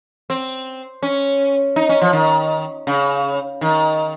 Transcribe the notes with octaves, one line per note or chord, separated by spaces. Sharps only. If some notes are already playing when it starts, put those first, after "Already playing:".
C4
C#4
D#4
C#4
F3
D#3
C#3
D#3